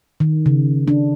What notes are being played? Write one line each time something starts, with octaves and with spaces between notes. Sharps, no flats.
D#3
C#3
D4